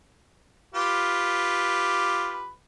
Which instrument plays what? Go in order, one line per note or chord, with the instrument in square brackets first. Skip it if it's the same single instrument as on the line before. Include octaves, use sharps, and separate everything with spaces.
[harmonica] F4 G4 B4